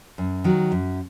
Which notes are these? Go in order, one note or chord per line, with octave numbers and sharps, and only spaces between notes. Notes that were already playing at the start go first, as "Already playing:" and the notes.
F#2
D#3 F#3
F#2